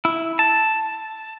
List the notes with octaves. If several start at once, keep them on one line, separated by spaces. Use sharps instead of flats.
E4
A5